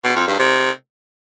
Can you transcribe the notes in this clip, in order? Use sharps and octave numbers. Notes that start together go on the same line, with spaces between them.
B2
F2
G2
C3